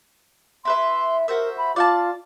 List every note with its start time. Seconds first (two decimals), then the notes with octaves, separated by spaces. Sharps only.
0.65 E4 B4 E5 C6
1.28 F#4 A#4 C5 E5
1.58 B5
1.76 F4 D5 F#5 A5